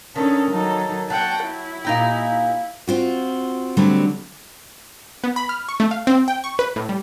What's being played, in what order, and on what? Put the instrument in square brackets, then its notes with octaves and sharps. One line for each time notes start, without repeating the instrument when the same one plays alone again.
[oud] D#3 [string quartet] C#4 D4 A4
[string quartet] F#3 D#4 A4
[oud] F#3 [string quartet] F#5 G5 A5
[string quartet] E4
[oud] A#2 D#4 G4
[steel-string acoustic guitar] C4 F4 F#4
D3 F#3 G3 A3 C4
[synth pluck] B3
B5
F6
C#6
A3
F5
C4
G5
C#6
B4
A2
G3